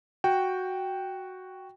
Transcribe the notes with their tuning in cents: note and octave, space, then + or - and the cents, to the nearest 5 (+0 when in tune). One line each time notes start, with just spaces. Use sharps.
F#4 +0 G5 +0